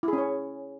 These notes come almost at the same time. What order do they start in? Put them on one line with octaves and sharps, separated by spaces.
E4 G#4 C#4 C#5